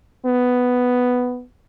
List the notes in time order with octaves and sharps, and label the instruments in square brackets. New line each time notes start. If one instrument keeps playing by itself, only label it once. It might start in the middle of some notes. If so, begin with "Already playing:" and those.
[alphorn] B3